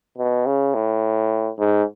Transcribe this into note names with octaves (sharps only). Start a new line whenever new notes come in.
B2
C#3
A2
G#2